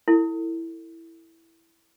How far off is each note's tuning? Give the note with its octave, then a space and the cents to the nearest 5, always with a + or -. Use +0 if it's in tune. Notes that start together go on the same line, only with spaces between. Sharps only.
E4 +0 A4 +35